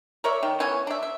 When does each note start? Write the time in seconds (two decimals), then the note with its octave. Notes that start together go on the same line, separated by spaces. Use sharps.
0.24 A#4 C#5 D5 E5
0.43 D#3
0.60 E3 B3 C#4 C#5
0.87 D4 E5
1.03 E5